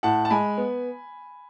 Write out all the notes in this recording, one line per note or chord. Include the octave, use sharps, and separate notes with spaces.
A2 F#5 A5
A5
G#3 G#5 B5
B3